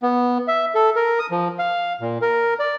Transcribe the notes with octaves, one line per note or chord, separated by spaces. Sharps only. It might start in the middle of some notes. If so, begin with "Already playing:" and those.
B3
E5
A4
A#4
D#6
F3
F5
A#2
A#4
D5